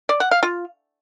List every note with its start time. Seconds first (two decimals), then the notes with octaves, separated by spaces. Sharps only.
0.09 D5
0.20 F#5
0.31 F5
0.43 F4